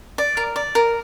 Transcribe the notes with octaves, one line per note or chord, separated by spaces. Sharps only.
D5
A#4
D5
A#4